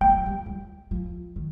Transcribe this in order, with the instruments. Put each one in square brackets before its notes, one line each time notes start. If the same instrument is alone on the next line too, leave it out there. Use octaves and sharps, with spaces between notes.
[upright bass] A#3 [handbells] G5
[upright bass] G3
F3
G3
G3
F3
D#3